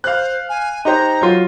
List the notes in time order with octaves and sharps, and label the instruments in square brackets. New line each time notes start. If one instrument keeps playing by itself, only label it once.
[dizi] C5 [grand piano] F5 F#6
[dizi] G#5
[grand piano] D#4 G4 C5 [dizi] A#5
[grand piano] F#3 F4